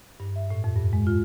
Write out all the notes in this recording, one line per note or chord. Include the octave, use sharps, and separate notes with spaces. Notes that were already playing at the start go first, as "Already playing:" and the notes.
G2
E5
A2
F2
G2
G#3
F4